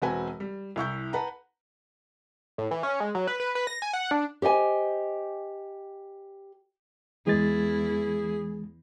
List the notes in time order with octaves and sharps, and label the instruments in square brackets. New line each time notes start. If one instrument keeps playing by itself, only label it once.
[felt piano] E1 C4 F#4 B4 G#5
G3
C2 E4 C#6 G6
B4 F#5 A5 A#5
[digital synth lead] A2
E3
C#4
G#3
F#3
B4
B4
B4
A#6
G#5
F#5
D4
[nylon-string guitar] G4 C5 D#5 G#5
[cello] E2 E4 [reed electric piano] E3 G#3 A6 [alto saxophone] G#4